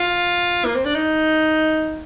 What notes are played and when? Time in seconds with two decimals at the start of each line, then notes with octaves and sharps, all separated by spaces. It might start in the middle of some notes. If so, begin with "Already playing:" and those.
Already playing: F4
0.65 A#3
0.75 C4
0.85 D4
0.95 D#4